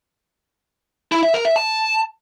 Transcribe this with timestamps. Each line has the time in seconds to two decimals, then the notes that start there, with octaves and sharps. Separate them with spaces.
1.12 E4
1.23 E5
1.34 A#4
1.45 E5
1.56 A5